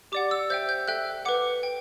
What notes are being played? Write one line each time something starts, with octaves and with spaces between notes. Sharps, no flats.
G4 D5 F#5 D6
E6
C5 E5 G5 G6
G6
A4 E5 G5 F#6
B4 F#5 D6
G5